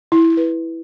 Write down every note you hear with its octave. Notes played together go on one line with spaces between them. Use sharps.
E4
B4